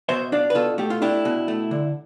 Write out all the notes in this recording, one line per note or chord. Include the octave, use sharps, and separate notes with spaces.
B2 C5 E5
D4 D5 F5
B4
B2 F4 A4
A3 G4
F4
D4 E4 G4
B2
A3
D3